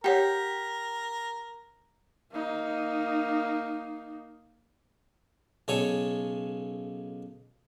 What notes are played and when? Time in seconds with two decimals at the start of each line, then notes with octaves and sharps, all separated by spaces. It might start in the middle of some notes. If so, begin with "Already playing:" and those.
0.04 G4 A#4 C#5 F#5 G5
2.32 A#3 D#4
5.68 B1 C#3 A4 C#5